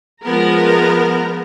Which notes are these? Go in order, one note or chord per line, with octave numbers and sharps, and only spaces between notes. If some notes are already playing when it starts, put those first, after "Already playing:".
F3 G#3 B3 A#4 A#5